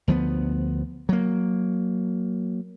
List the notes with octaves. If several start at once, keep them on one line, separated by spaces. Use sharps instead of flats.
D2 F3 F#3 B3
F#3 A#3